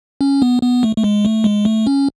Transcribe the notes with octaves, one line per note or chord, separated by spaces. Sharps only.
C#4
B3
B3
A3
A3
G#3
A3
G#3
A3
C#4